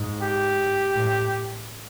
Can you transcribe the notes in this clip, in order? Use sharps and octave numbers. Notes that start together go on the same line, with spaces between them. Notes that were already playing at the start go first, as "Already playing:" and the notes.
Already playing: G#2
G4
A2